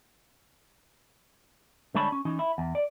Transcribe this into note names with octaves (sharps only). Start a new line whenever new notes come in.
D3 G3 G#3 C#5 A5 B5
C#4
E3 C#4 D#4
E4
E2
D5